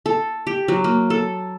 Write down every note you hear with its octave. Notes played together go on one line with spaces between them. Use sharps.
A4
G4
F#3
A#3
A4